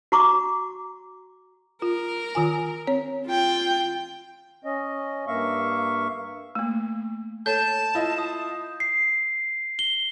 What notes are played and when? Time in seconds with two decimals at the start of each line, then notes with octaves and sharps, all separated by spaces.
0.12 F#4 A#5 C#6 D6
1.82 F4 A#4
2.35 D#3 F4 G#5
2.87 C4 C#5
3.27 F4 G5
4.65 C#4 D#5
5.28 G2 A#3 E5 F5 C#6
6.55 A3 A#3
7.46 A4 C#5 A5 G6
7.95 E4 F4 D#5
8.18 D#6
8.80 C7
9.79 G7